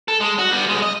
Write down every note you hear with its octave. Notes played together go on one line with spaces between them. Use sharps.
A4
G#3
F#4
G3 B3
B1 G#3
D#5